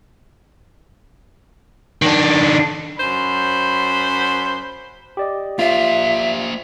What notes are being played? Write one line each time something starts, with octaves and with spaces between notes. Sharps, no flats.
D#3 D4
F#2 C5 B5
G4 D5 D#5
A#3 F4 C5 E5